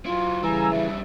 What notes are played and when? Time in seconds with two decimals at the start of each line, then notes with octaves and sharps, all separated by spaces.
0.06 F#3 E4 F4
0.43 C#3 E3 G3 G#5 A#5 E6
0.71 F2 G3 E5